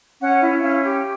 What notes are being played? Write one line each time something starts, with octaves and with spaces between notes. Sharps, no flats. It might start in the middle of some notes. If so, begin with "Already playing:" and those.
C#4 F#5
E4
C#4 F5
G4